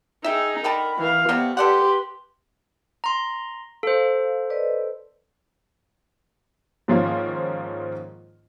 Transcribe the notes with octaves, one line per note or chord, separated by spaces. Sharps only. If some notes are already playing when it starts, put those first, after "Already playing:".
D#4 G#4 E5 G5 E6
D3 A#4 G5 A5 B5
E3 F5
C3 G3 A3 B3 F#5
G4 A4 B4 D5 F#5 C6
A#5 C6
A4 C5 F5
B4 D5 D#5
G#2 D#3 F3 A#3 C#4 F4